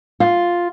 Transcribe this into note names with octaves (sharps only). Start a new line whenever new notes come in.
F4